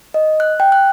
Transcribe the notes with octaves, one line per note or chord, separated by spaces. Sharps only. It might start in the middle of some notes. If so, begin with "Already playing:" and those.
D#5
F#6
G5
F#6